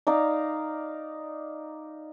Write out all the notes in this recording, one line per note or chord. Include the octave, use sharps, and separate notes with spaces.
D#4 D5 F5 A#5